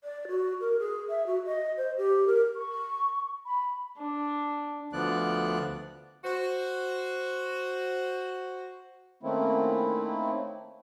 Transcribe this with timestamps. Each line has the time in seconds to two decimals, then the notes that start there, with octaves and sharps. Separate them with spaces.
0.04 D5
0.28 F#4
0.61 A#4
0.79 G#4
1.10 E5
1.27 F#4
1.46 D#5
1.77 C5
1.97 G4
2.27 A#4
2.56 C#6
3.46 B5
3.98 D4
4.93 D2 D3 F3 B3 D5 F#6
6.24 F#4 C5
9.23 D#3 A3 A#3 C4 C#4 E4